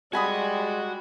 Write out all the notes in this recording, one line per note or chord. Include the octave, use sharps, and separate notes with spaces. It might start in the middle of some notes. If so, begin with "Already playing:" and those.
G3 G#3 F#4 F#5 G#5 B5 D#6